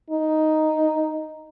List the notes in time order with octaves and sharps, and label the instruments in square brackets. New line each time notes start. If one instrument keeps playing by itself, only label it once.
[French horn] D#4